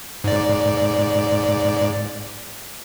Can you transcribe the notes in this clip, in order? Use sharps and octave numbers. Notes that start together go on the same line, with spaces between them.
G#2 D5